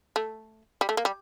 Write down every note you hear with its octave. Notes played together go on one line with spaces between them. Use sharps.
A3
G3
A3
A#3
G3